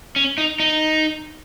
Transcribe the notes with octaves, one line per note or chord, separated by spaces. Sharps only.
C#4
D#4
D#4